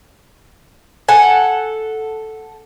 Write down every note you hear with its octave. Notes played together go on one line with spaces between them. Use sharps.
A4 F#5 G#5